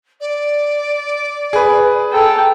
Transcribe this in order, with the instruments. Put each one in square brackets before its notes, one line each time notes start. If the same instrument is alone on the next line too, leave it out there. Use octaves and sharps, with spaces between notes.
[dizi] D5
[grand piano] G#4 B4
[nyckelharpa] A4 G5 [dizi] A#5